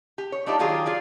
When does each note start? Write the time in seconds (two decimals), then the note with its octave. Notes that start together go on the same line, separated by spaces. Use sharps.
0.18 G4
0.32 C#5
0.46 A3 D4 D#4 F4 G4
0.59 D#3 F#3 F4 G4 G#4
0.86 F4 G#4 D5